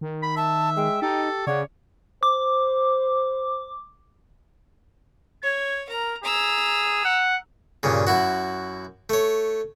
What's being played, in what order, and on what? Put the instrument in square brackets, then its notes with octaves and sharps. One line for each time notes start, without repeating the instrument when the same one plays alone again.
[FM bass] D#3
[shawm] B5
[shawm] E5 [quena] A5
[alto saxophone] G#3 [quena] G5
[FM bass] D#4 [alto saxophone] G4 [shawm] A4
[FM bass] C#3 [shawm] C#5 [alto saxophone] D5 [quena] F#5
[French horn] C5 [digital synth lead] D6
[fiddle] C#5 [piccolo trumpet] G#6
[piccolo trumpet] A#4 [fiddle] A#5
[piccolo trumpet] G#4 [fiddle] A#5 E6
[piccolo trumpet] F#5
[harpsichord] G2 A#2 C#3
F#2 E4 F#4
A3 C#5